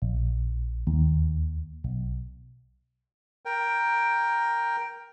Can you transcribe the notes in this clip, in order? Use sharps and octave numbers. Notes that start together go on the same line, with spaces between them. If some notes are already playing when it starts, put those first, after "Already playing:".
A#1
D#2
B1
A#4 G5